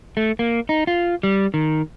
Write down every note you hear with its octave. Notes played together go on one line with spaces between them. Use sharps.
A3
A#3
D#4
F4
G3
D#3